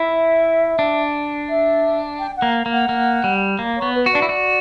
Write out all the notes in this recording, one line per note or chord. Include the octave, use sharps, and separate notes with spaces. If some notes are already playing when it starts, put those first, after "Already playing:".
Already playing: E4 E5
D4
E5
G5
F#5
A#3
A#3
F#5
A#3
G3
A#3
C#5
B3
B4
F#4
D4 D5
E4
F#4